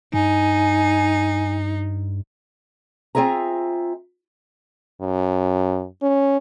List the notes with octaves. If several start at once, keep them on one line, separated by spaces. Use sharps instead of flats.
G2 D#4 G#5
C4 F4 G#4 E5 A#5
F#2
C#4